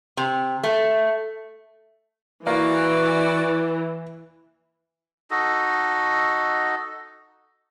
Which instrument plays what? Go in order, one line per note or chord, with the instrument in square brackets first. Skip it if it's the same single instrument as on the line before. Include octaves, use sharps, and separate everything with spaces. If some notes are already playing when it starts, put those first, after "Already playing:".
[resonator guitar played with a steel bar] C3
A3
[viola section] E3 [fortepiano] A#3 [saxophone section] F#4 D5 [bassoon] B4
[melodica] D#4 F#4 A4 D#5